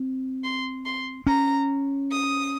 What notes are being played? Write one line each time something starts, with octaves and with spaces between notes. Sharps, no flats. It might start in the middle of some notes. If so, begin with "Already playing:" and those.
Already playing: C4
C6
C6
C#4 A#5
D#6